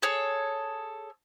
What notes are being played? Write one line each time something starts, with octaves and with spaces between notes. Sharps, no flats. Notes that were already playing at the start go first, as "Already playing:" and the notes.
G#4 A4 C#5